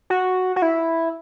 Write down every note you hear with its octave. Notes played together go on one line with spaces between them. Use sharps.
F#4
F#4
E4